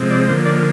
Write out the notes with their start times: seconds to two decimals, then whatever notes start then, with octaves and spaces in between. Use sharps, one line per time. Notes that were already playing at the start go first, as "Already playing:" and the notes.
Already playing: C3 F3 G#3 C4
0.10 D5
0.28 D3 F3 A#3 C5
0.46 D5